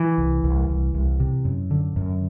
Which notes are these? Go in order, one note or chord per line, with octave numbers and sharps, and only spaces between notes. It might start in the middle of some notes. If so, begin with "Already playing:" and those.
Already playing: E3
C2
C2
C2
C2
C3
F#2
D3
F#2